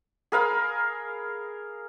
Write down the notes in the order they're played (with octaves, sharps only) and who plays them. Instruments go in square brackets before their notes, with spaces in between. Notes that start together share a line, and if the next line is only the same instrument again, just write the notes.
[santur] G#4 A#4 F5 B5